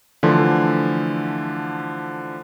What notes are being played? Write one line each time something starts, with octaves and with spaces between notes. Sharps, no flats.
D3 E3 F3 A3 D4 C6